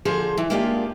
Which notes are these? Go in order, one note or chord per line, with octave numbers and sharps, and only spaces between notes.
D3 F3 G#4 C5
E3
G#3 A#3 D4 F4 G4